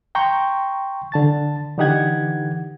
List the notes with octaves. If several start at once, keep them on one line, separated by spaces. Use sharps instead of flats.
G5 A#5 C6 C#6 G6
D3 A5 A6
D3 E3 D#4 G4 F#5 G#6